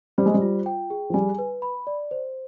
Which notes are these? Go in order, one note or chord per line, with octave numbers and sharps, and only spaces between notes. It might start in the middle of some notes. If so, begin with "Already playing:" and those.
G3 C5
G#3
G3
F4
G5
G#4
F3
G3 G#5
B4
B5
D5
C5